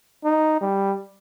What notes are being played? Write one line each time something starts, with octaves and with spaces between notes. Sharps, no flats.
D#4
G3